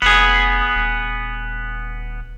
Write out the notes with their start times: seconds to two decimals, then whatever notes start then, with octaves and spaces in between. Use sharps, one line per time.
0.02 F1 B3 G#4
0.75 D#1